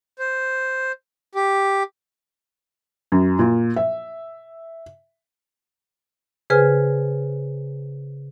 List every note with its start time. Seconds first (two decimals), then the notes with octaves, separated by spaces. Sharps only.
0.19 C5
1.35 G4
3.12 F#2
3.39 A#2
3.76 E5
6.50 C#3 G#4 B4 C5 G#5 F6